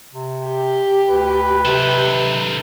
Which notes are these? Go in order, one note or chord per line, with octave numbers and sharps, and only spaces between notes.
C3
G4
D2 B4
C3 D#3 A4